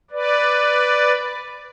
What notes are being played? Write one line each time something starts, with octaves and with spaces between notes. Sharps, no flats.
B4 D5